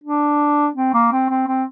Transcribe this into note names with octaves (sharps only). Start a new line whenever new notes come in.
D4
C4
A#3
C4
C4
C4